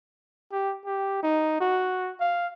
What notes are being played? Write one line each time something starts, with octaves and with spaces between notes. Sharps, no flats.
G4
G4
D#4
F#4
F5